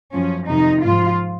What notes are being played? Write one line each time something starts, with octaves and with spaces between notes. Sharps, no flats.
F#2 F3 C#4
F2 C3 D#3 D#4
G#2 F3 F4